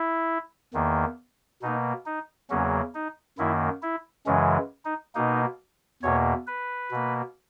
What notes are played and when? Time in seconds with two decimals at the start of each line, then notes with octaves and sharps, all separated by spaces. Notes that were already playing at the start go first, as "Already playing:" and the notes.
Already playing: E4
0.74 E2 D#3 A#3
1.62 B2 A#3 D#4
2.06 D#4
2.50 E2 C#3 F#3 A#3 C#4
2.95 D#4
3.38 F#2 D#3 A#3 E4
3.83 E4
4.26 F#2 C#3 E3 G#3 C#4
4.85 D#4
5.15 B2 A#3 D#4
6.03 E2 B2 A#3 C#5
6.47 B4
6.91 B2 A#3